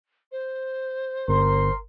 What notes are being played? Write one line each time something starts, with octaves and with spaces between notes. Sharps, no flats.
C5
G1 A#4 C6